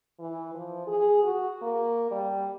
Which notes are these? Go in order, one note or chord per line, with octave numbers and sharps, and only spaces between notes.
E3
F3
G#4
F#4
A#3
G3